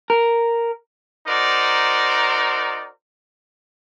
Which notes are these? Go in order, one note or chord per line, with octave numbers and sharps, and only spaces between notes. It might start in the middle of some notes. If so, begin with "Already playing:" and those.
A#4
D#4 F#4 A#4 C5 D5